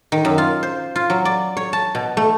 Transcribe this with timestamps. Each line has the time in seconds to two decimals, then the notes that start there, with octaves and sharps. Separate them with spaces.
0.12 D#3
0.25 F#2
0.38 F4
0.63 C5
0.96 F4
1.10 F#3
1.25 D5
1.57 C#5
1.73 A5
1.95 B2
2.17 A3